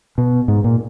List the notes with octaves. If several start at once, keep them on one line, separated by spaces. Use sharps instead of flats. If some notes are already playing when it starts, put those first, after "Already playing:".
B2
G#2
A#2